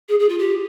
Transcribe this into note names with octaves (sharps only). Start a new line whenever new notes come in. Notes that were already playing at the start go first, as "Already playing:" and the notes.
G#4
G#4
F4
G4